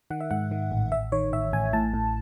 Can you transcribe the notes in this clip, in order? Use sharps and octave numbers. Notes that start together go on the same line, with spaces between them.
D#3 F#5
E5
G#2 F#5
D#3
A1
A1 E5
D#3 C#5
A1 E5
A1 G#5
A2 A5
A2